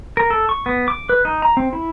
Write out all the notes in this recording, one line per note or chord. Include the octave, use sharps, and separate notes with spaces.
A#4
A4
C#6
B3
D6
B4
D#4
A#5
C4
E4